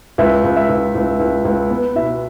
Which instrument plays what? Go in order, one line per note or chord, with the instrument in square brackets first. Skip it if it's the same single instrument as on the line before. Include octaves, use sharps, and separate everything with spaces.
[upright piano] C#2 E5
C#2
E5
C#2
C#2
C#2
C#2
B3
B2 E5